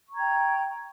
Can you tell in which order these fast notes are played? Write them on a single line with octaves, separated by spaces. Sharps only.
C#6 A#5 G#6 G5